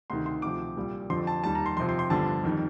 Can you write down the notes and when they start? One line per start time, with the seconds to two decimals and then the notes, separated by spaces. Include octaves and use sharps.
0.10 D2 C3 D#3 C6
0.26 C6
0.42 D2 C3 F3 D6
0.77 C2 A#2 G3
1.10 F2 D3 F3 C6
1.27 A5
1.44 D#2 D#3 G3 A5
1.55 A#5
1.66 C6
1.77 F2 C6
1.80 C3 F3
1.89 C6
1.99 C6
2.10 G1 G2 D3 F3 A5
2.44 F2 D#3 G3